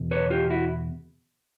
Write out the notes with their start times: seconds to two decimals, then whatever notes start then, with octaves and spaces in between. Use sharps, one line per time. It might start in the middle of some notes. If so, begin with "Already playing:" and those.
Already playing: E2 B2
0.11 B4 C#5
0.30 F4 G4
0.50 E4 F#4